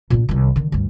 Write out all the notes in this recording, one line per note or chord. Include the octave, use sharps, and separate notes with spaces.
A#2 D4
C2 D#3
D3 D#3
D2 G2